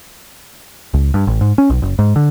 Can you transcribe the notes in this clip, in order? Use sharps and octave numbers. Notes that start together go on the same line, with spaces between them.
C#2
G2
A1
G#2
C#4
B1
F#1
G#2
D3